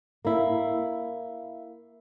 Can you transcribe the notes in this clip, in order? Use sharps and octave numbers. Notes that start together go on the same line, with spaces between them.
A#3 E4